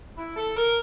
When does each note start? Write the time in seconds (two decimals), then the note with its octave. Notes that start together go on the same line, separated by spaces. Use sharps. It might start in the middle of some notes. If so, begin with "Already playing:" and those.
0.18 E4
0.36 A4
0.57 A#4